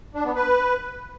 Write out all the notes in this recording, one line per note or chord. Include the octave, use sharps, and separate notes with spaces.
D4
B3
B4